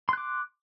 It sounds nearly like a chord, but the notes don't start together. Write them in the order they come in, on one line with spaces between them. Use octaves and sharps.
C6 F#6 D6